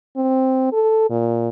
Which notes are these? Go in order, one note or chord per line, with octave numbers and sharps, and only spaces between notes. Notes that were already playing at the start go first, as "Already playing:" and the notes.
C4
A4
A#2